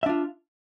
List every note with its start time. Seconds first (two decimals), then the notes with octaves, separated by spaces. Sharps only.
0.03 E5
0.06 D4
0.09 F4